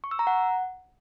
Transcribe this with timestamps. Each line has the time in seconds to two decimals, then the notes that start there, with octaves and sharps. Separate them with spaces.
0.04 C#6
0.11 E6
0.19 A#5
0.27 F#5